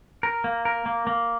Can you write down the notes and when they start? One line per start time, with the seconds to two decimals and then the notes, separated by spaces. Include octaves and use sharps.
0.23 A#4
0.44 A#3
0.65 A#4
0.86 A#3
1.07 A#3